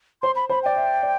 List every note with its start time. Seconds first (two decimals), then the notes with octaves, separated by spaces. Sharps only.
0.22 C5 C6
0.36 B5
0.49 C5 B5
0.63 D5 G5
0.76 E5
1.03 D5